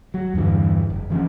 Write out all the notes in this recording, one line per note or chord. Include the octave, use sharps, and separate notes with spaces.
F#3
E2 G2 D3 E3
F#1
E3 F3 C4 C#4